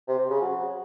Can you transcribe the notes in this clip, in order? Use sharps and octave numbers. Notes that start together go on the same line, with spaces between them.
C3
C3
C#3
F#3